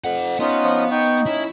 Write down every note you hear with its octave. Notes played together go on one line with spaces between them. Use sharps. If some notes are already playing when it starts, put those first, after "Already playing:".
F2 C5 F#5
B3 C#4 D#4 F4
F3
D#4 G5 C#6
C#4 E4